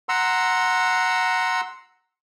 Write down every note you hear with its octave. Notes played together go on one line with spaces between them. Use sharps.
F#5 A#5 C6 E6